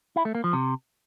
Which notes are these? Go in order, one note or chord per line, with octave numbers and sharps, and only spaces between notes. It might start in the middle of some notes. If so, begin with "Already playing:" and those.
E4
A3
A#3
F3
C3